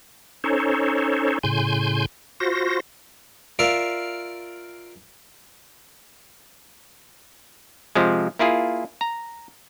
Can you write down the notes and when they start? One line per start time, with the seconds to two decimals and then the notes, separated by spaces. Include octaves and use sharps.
0.44 C#4 D#4 A4 C5 C#5
1.43 A2 C#3 G#5 C6 G6
2.40 F4 F#4 C5 A#6
3.59 F4 A#4 D5 E5 F5
7.95 C3 F3 G#3
8.39 A#3 E4 F4 G#4
9.01 A#5